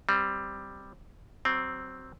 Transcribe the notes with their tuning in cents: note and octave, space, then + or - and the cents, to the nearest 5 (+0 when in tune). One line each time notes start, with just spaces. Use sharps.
G3 +0 C4 +0
F#3 +25 C4 +0